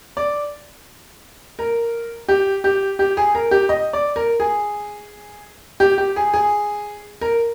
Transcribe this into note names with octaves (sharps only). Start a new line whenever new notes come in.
D5
A#4
G4
G4
G4
G#4
A#4
G4
D#5
D5
A#4
G#4
G4
G4
G#4
G#4
A#4